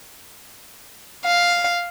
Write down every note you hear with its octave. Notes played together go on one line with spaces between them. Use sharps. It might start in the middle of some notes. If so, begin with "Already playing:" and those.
F5